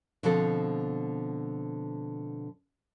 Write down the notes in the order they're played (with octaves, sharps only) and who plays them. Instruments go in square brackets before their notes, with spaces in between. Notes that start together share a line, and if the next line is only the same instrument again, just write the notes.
[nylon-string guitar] B2 D3 F3 C4 A4